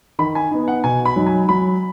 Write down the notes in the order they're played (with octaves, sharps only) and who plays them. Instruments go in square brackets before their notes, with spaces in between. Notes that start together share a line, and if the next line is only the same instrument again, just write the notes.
[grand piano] D#3 B5
G#5
B3 D#4
F#5
B2 G#5
B5
F#3 D#4
G#5
F#3 B5